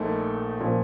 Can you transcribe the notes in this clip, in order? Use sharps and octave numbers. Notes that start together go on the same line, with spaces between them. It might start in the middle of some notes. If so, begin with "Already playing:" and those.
Already playing: A#1 A#2 A3 D#4
A#2 F3